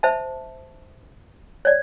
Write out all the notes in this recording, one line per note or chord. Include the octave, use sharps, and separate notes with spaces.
C5 E5 A5
C#5 D5